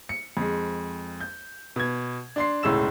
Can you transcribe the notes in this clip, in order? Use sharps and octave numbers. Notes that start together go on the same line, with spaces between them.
C#7
F2 G#3
G6
B2 G#6
D4 C6 C7
E1 C#2 A2 G#3 E6 E7